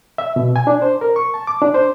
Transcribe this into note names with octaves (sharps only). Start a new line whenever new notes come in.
E5
B2
G#5
D4
C5
A#4
C#6
A5
D6
D4
C5